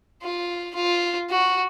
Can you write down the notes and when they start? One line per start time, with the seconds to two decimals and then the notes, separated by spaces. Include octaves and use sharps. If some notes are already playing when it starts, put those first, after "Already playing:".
0.22 F4
0.75 F4
1.30 F#4